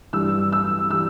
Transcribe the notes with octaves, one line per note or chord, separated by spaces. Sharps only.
G2 E3 G3 E6
E6
E3 G3 E6